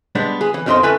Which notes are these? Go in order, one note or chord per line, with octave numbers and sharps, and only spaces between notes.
G3 G#3 B3 D4
B3 G#4
E3
F2 D#3 G3 C4 D#5 C6
F#2 A3 B4 G#5